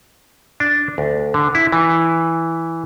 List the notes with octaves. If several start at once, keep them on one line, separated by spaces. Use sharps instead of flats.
D4
D2
D3
E4
E3